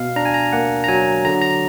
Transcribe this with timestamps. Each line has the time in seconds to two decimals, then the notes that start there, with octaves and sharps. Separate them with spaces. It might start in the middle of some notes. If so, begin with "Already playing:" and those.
Already playing: B2 F5
0.16 D4 A#5
0.25 G#5
0.34 A#5
0.53 A#3 F#5
0.84 A#5
0.88 F#3 G#5
1.25 D3 A#5
1.41 A#5